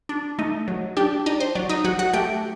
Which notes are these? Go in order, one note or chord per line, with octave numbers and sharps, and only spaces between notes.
D4
A3 D#4 D#5
F#3
D4 G4 G5
D4 D#4 D#5
C5
F#3 D5
D#4 D#5
F#3 F#4 F#5
F#4 F#5
A3 G4 G5